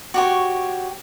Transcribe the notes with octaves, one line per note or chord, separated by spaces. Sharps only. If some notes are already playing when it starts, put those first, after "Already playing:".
F#4 G4 C#5